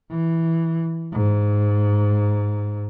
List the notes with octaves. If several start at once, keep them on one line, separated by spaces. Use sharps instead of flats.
E3
G#2